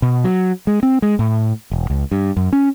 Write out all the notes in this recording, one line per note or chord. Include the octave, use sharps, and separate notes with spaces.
B2
F#3
G#3
C4
G#3
A2
E1
C#2
G2
F#2
C#4